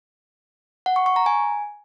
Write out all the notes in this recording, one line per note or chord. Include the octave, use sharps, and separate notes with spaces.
F#5
C#6
C#6
A#5
G#5